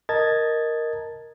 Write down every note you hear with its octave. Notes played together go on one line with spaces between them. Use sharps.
A#4 D#5 A5 A#5 G#6 A6